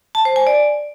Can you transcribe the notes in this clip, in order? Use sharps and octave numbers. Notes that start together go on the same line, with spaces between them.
A5
C5
G#5
D5